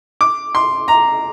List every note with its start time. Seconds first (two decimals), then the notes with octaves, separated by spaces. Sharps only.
0.21 D6
0.55 C6
0.88 A#5